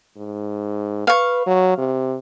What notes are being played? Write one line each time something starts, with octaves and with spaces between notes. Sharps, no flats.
G#2
B4 F5 C#6
F#3
C3